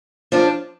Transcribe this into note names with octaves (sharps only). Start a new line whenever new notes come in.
F3 D4 F4